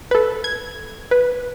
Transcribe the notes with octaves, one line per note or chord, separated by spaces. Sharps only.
A4 B4
G#6
B4